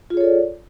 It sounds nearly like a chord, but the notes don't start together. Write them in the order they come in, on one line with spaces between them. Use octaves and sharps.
F4 G#4 C#5 A4 D5